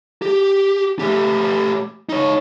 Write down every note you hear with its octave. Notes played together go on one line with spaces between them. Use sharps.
G4
A3 G4
D#4 C#5